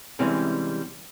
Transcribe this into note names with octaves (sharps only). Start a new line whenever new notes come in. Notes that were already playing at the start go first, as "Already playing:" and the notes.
C3 E3 G3 G#3 C4 C#4